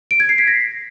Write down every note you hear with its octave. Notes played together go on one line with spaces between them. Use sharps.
D7
G#6
C7
B6
A#6